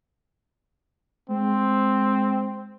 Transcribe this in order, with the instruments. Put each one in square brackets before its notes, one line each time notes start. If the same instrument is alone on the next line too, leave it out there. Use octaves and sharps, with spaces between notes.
[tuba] G#3 [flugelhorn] C4